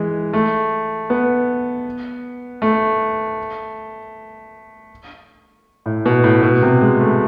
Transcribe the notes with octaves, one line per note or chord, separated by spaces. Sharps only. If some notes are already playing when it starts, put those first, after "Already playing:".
Already playing: E3 G#3
A3
B3
A3
A2
B2
A2
B2
C3
G#3
A3